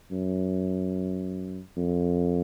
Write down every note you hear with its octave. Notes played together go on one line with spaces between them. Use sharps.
F#2
F2